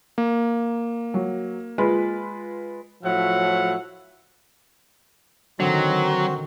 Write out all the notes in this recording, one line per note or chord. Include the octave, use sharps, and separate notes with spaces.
A#3
F#3
G#3 F4 B4
A2 F3 F#3 E5 F#5
D3 D#3 F#3 C4 F#4